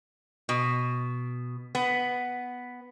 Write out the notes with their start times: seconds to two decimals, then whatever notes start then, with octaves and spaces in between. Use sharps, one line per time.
0.49 B2
1.75 B3